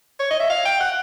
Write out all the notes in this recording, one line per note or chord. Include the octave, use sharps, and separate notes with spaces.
C#5
D#5
E5
F5
G5
F#5